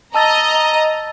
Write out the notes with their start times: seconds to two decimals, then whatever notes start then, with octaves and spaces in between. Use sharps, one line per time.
0.15 D#5 A5 A#5 E6 A6